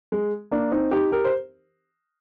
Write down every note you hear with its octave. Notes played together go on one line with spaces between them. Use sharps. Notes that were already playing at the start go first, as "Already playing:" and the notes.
G#3
A#3 D4
C4 D#4
D#4 G4
G4 A#4
C5